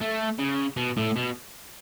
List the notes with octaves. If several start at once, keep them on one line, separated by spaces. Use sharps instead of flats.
A3
C#3
B2
A2
B2